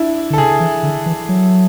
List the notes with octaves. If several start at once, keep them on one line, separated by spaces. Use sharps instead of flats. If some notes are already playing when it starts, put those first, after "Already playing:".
Already playing: D4 E4
D3
A4
C#3 G#4
E3
D3
E3
F#3